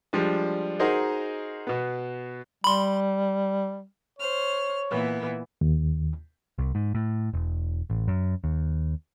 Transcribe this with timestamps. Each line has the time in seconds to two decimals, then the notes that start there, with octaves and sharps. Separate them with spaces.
0.13 F3 G3 G#3 D4
0.79 D#4 F#4 G#4 A#4 C5 D#5
1.67 B2 B3
2.64 G3 B5 C6
4.19 C5 C#5 F6
4.90 A#2 E3 B3
5.61 D#2
6.58 C2
6.75 G#2
6.95 A2
7.33 E1
7.90 A1
8.08 F#2
8.44 D#2